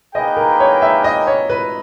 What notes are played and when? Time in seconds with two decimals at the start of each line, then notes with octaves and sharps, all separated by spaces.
0.14 A#3 D#4 G#4 B4 D#5 G5
0.37 A#4
0.60 C#5
0.82 E5
1.04 D#5
1.27 C#5
1.50 B4